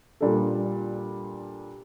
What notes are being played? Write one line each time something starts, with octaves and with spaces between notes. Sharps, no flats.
A#2 G3 D4 A4